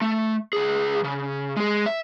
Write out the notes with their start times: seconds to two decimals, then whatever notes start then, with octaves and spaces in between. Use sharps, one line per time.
0.02 A3
0.53 C#2 G#4
1.04 C#3
1.57 G#3 G#4
1.86 E5